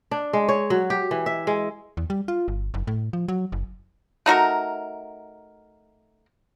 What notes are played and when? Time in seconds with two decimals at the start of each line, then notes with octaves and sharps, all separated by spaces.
0.11 D4
0.33 G#3
0.49 C#5
0.70 F#3
0.90 G4
1.11 E3
1.26 E5
1.47 G#3
1.97 E2
2.10 G3
2.28 F4
2.48 G1
2.74 F#1
2.87 A2
3.13 F3
3.28 F#3
3.52 F#1
4.26 A3 D#4 F#4 A#4